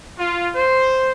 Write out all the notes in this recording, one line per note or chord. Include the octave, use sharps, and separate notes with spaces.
F4
C5